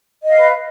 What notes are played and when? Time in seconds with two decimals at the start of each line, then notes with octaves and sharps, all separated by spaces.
0.23 D#5
0.28 F5
0.33 B4